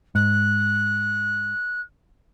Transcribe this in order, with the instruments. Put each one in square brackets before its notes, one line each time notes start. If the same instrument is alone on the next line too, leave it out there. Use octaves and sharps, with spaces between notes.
[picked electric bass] G#2 [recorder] F#6